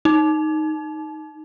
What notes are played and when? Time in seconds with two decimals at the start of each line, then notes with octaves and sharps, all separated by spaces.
0.05 D#4